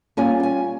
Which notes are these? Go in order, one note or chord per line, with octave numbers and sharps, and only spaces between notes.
G3 A#3 C#4 F4 G#5
G5
G#5